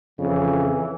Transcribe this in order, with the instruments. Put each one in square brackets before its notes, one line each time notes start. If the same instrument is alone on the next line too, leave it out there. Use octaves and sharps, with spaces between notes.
[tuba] F2 [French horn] C#3 [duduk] E3